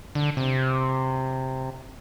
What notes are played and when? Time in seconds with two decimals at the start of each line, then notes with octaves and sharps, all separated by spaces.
0.15 D3
0.37 C3